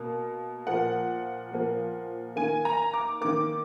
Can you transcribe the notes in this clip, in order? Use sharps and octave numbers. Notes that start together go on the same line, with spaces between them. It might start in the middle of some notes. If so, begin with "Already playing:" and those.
Already playing: B2 A#3
A#2 F3 A#3 F#5
A#2 F3 A#3
D#3 A#3 G#5
A#5
D6
D#3 A#3 D6